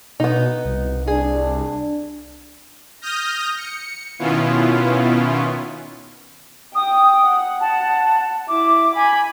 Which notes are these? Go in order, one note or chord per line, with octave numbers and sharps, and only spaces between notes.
B2 B3 D#4
C2
D4 G#4
D#6 F6 G6 A#6
C#7
B2 D#3 B3 C#4 E4 F4
G5 D#6
F#5
A5
E4 D6
G#5 B5